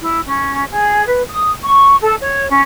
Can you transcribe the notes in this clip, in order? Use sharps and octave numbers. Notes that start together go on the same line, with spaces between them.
E4
C#4
G#4
B4
D#6
C#6
A4
C#5
C#4